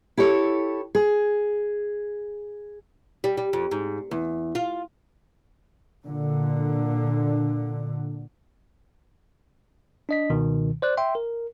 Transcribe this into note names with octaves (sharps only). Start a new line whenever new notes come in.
E4 G4 A4 C#5
G#4
G3
G3
F2
G#2
E2
F4
A#2 D3
D4 D#5 B6
C#2 B2 D#3
C5 D5 F#6
E5 G5 C6
A#4